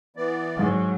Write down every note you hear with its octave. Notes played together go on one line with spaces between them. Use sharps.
E3 B3 D5
G#2 F#3